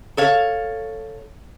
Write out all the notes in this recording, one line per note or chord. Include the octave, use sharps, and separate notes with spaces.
A4 C#5 F5